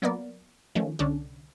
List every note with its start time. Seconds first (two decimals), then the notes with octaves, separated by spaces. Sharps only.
0.02 F#3 A#3 B3 A#4 D5
0.75 D#3 F3 A3 C#4
0.99 C2 D3 C#4 D4